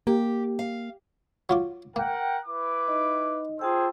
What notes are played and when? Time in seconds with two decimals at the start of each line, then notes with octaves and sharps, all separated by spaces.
0.07 A#3 G4
0.59 F5
1.49 F#3 F4 D6
1.96 A#3 A#4 F#5 G5
2.46 E4 B4 D6
2.88 D#4 D#5
3.59 F4 G#4 A4 C5 G5 E6